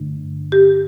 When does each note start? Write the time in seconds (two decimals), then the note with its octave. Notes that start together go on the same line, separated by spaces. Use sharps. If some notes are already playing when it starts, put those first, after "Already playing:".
Already playing: G2 D3 A3 D4
0.52 G4